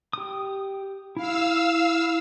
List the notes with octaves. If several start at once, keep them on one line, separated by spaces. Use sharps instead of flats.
G4 D#6
E4 F5 E6